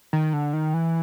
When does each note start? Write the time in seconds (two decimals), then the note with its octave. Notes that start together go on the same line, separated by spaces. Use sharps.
0.13 D#3
0.33 D3
0.53 D#3
0.74 E3